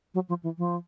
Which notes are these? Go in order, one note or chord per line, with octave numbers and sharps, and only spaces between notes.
F#3
F3
E3
F3